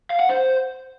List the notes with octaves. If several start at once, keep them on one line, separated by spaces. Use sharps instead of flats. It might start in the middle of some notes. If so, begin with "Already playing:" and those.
F5
F#5
C5